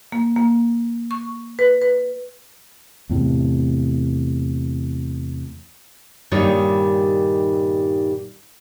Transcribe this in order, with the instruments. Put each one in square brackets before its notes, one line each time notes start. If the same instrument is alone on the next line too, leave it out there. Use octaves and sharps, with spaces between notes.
[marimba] A#3
A#3
C#6
B4
B4
[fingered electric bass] E2 A2 C3
[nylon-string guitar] G2 A#2 D#3 G3 D#4 C#5